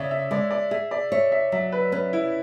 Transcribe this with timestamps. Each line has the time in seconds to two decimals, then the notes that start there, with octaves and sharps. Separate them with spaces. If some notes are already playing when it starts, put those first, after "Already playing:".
Already playing: C#3 C#5 D5 E5
0.11 E5
0.31 G#3 D5
0.51 D5
0.71 G#4 E5
0.91 D5
1.12 C#5 E5
1.32 E5
1.52 F#3 E5
1.72 B4
1.92 C#4 B4
2.13 E4